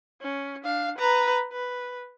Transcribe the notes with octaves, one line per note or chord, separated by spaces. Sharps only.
C#4
D4 F5
B4 A#5
B4